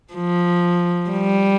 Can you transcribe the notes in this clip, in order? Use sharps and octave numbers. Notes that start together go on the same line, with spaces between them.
F3
G3